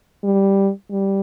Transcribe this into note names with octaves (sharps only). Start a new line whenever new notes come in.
G3
G3